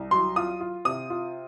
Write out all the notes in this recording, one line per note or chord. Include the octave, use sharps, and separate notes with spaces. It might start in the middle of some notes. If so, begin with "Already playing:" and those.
Already playing: C2
F#3 C6
F4 D#6
F4
C3 D#6
F4